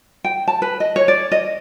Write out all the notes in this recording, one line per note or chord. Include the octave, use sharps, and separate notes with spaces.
G5
A5
B4
D#5
C#5
D5
D#5